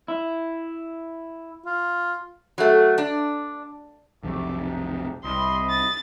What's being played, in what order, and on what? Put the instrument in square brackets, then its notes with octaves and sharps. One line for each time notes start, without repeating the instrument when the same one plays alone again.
[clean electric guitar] E4
[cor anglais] F4
[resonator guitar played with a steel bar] F#3 A3
D4
[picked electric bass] B1 F2 C3 [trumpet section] A3 D6
[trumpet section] D4 D#4
[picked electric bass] C2 [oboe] D#5 [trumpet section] B5 [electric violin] C6
[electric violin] A6